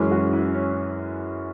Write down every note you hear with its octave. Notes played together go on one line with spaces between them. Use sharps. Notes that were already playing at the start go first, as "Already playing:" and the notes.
Already playing: F#2 E3 G#3 C#4
F#4
E4
C#4